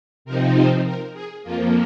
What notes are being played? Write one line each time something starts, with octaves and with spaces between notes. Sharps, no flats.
C3 F3 C4 D#4 A#4
C5
A#4
G#4
F2 F3 A#3 F4